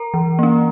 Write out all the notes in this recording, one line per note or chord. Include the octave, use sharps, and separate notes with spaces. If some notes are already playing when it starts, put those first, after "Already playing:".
Already playing: A#4 A#5
E3
A#3 C#4